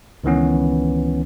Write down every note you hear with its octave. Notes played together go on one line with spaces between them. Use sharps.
C#2 D#3 E3 B3 C#4